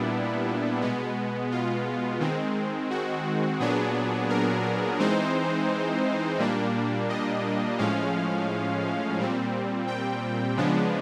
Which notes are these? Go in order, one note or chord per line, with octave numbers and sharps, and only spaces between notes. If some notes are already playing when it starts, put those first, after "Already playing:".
Already playing: A#2 G3 B3 D4 E4
B2 G#3 B3
F4
D#3 G#3 C4
F#4
A#2 F#3 B3 D4 G#4
A#4
E3 G#3 C4 D#4 C5
A#2 G3 A#3 D4
D#5
A2 F3 G#3 C#4 F5
A#2 G3 C4
G5
C#3 F3 G#3 B3 D4